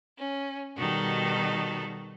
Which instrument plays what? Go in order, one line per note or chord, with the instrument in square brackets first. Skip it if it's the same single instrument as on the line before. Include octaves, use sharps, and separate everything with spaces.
[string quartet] C#4
B2 D#3 G3 D#4 F#4 A4